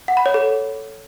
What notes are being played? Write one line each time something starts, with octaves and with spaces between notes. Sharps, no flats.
F#5
B5
C#5
A4